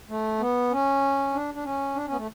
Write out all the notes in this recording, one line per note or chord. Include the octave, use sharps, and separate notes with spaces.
A3
B3
C#4
D4
D4
C#4
D4
C#4
B3
A3